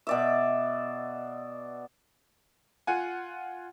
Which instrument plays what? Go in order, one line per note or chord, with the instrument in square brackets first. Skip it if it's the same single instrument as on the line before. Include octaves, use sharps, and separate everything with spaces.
[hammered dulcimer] B2 D5 E5
[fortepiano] F4 F#5 G#5